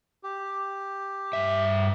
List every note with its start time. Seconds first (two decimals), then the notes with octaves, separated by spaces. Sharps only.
0.23 G4
1.33 G2 E5